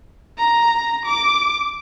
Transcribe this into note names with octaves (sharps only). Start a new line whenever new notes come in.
A#5
D6